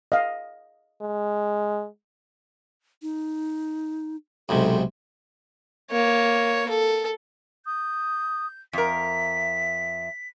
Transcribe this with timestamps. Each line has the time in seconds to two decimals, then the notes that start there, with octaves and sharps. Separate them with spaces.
0.12 D#5 F5
1.02 G#3
3.02 D#4
4.49 B1 G#2 C3 A4
5.91 A#3 C#5
6.69 A4
7.66 D#6 G6
8.73 F2 A#4 E5 B6